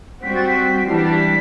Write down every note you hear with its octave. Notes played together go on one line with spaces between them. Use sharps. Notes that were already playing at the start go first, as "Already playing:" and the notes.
G3 C4 F#4 B6
A6
B6
E3 G3 D4 C7
B6
A6
B6